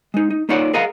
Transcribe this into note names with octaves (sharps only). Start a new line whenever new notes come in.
G#3 D#4
D#4
A#3 D#4 F4 C#5 D5 F#5
G#4 A#4 D#5 F5 F#5 A#5